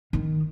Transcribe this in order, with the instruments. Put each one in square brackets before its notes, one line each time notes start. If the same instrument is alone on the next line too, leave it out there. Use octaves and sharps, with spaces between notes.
[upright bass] D#3